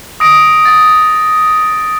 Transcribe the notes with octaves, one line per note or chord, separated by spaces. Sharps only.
D#6 A#6 D7
A6